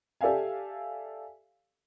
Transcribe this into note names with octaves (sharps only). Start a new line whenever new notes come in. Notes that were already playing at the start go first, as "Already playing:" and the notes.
G4 A4 D5 E5 F5 G#5